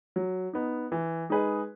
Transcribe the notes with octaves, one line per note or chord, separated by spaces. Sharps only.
F#3
B3 D#4
E3
G#3 D#4 G#4 B4